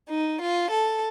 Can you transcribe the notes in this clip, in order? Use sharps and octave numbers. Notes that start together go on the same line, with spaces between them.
D#4
F4
A4